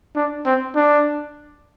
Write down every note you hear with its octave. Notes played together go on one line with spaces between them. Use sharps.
D4
C4
D4